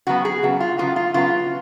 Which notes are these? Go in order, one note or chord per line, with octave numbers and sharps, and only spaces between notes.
C#3 F#3 B3 F#4
G#4
C#3 F#3 B3
F4
C#3 F#3 B3 F4
F4
C#3 F#3 B3 F4